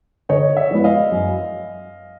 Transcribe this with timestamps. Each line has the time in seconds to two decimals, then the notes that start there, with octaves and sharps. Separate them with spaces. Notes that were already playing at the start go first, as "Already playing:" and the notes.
0.29 D3 C#5 D#5
0.57 D5 E5
0.71 F3 G#3 B3 E4
0.84 D#5 F5
1.12 F#2